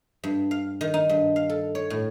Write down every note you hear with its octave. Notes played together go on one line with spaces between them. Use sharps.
G2
F5
D#3
D#4
G2
F5
A4
C#5
A2